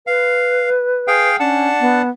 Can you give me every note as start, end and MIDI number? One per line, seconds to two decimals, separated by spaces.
0.07 1.29 71
0.07 0.70 77
1.08 1.36 68
1.08 1.36 77
1.08 1.36 79
1.40 1.69 61
1.40 2.02 62
1.40 2.02 78
1.40 2.02 81
1.80 2.08 59